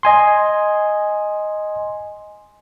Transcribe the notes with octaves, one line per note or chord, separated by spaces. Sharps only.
D#5 G#5 C6